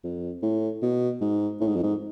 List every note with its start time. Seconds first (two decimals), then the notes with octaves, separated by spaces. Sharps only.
0.04 F2
0.43 A2
0.82 B2
1.21 G#2
1.60 A2
1.68 G#2
1.75 F2
1.83 G#2